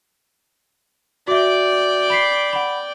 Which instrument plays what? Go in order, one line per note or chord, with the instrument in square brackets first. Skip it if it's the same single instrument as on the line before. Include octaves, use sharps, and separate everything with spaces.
[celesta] F#4 E5 [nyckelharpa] D5 G5
[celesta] B5 B6 C7
F#5 B5